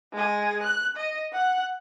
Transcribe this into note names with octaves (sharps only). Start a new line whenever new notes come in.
G#3 G#4
F#6
D#5
F#5 F#6